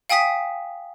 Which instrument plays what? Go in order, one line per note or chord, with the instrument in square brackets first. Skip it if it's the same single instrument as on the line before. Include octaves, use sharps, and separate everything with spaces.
[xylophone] F5 G5 G#5 D#6 B6